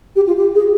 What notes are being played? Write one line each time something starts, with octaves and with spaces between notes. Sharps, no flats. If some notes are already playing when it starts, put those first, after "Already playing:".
G4
F4
G4
G#4